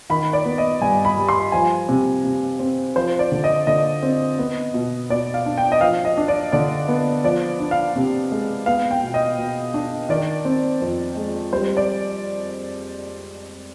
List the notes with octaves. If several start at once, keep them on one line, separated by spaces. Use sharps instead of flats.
D#3 B5
D5
B3
D#5
G2 G#5
B5
G3
C6
F3 G#5
C3
C3
C4
F3 C5
D5
D3
D#5
D3 D#5
C4
B3
B2
B2 D5
F5
D4
G5
D#5
F3 F5
D#5
D4
D5
D3 D5
B3
F3 D5
D4
F5
C3
G#3
B3 F5
G5
B2
D#5
B2
D4
D#3 D5
C4
F2
G#3
G3 C5
D5